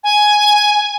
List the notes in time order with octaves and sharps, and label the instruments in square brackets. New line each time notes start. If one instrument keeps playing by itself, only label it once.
[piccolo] G#5